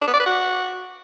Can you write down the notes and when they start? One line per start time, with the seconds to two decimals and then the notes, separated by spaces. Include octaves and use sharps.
0.01 D4
0.08 B3
0.14 D5
0.20 B4
0.26 F#4